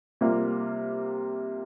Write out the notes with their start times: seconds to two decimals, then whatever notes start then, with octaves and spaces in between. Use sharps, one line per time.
0.21 C3 G3 A#3 F4